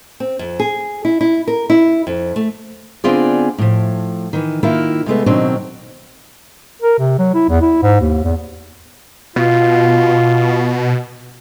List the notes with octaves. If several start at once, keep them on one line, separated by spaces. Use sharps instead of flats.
C4
F2
G#4
E4
E4
A#4
E4
F2
A3
D3 B3 C4 F4 G#4 D5
A2 F3
D#3 E3
D#3 A#3 E4 F4
C3 G#3 A3 B3
B2 D#3 F#3 C4 D4
A#4
C3
F#3
E4
E2
E4
G#2
D#2
E2
B2 F4